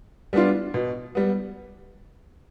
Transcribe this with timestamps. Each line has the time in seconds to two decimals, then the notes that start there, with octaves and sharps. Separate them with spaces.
0.33 G3 B3 D4 F4
0.74 B2
1.15 G3 B3